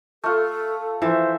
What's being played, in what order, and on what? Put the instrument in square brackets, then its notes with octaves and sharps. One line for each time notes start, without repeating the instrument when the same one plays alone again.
[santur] A3 F4 [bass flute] A4
[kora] E3 F3 [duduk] C5 [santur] E5